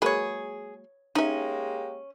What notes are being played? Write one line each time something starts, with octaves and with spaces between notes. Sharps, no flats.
F#3 G#3 A#3 G#4 B4 C#5
G#3 A#3 C#4 D#4 G4 E5